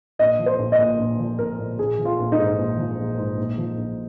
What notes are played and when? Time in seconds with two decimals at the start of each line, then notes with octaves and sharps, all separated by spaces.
0.19 A#1 D#5
0.39 F3
0.46 C5
0.59 A#1
0.72 D#5
0.79 A#2
0.99 A#1
1.19 F3
1.39 A#1 A#4
1.59 A#2
1.79 A#1 G#4
1.99 F3
2.05 F4
2.19 A#1
2.32 D#4
2.39 G#2
2.58 A#1
2.78 F3
2.98 A#1
3.18 G#2
3.38 A#1
3.58 F3
3.78 A#1